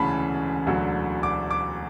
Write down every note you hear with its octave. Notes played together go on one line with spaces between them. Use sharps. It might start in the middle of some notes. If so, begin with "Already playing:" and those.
Already playing: E1 D2 C#3 E3 G#5 A5 B5
E1 D2 D3 F#3
D6
D6